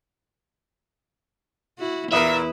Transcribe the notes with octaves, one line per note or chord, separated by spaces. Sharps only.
E4 F#4
E2 A#2 E4 A#4 B4 E5 D#6